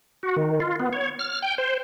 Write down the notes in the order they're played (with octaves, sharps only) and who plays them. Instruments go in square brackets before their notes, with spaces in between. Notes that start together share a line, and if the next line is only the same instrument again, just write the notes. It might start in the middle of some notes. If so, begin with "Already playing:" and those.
[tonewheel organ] F#4
D#3
F4
B3
C#5
F6
G5
C5